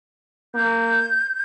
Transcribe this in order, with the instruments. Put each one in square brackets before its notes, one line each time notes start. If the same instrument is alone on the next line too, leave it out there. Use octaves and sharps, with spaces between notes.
[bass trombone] A#3 [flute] G6